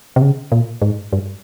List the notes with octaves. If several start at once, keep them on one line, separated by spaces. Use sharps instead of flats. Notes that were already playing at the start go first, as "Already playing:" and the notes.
C3
C#3
A#2
G#2
G2